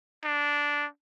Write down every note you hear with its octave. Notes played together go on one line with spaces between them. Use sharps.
D4